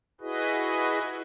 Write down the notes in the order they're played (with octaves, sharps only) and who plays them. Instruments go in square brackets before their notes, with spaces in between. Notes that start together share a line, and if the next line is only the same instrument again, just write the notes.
[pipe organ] E4 F#4 G#4 B4 D#5